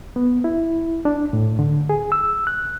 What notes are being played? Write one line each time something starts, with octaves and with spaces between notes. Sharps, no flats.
B3
E4
D4
A2
D3
G#4
E6
F#6